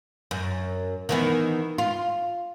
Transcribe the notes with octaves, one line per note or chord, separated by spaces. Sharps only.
F#2
D#3 E3 B3
F4